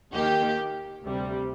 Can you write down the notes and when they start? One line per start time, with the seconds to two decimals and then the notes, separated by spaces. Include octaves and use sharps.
0.11 D#2 D#3 A#3 G4
1.02 D2 C3 G3